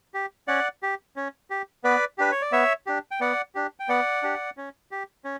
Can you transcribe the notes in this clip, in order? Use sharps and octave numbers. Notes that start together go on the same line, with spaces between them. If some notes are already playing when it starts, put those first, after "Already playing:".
G4
C#4 D5 F#5
G4
C#4
G4
B3 B4 D5
D4 G4 B4
C#5
D5
B3 C#5 E5
D4 G4
G5
B3 D5 F#5
D4 G4
G5
B3 D5 F#5
D4 G4
C#4
G4
C#4